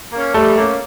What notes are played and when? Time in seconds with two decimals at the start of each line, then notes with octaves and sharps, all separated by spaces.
0.13 A#3 C#4
0.34 G3 A3
0.57 A#3 C#4